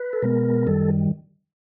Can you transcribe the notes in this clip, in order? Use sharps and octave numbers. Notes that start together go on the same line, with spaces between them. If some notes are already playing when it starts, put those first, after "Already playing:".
Already playing: B4
A4
B2 G#3 B3 A#4
F#2 D#3 G3 A4